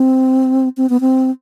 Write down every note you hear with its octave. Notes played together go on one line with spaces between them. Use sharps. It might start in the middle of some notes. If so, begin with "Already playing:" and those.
Already playing: C4
C4
B3
C4